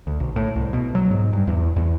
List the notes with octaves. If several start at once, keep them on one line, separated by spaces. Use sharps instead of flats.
D2
B1
A2
C2
B2
F#3
G#2
G2
E2
E2